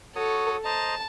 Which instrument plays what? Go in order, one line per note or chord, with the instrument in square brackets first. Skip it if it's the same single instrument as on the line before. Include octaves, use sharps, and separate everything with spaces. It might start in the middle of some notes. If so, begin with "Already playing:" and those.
[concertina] F#4 C#5 D#6 [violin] A4
[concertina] C5 D#5 A#5 [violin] A5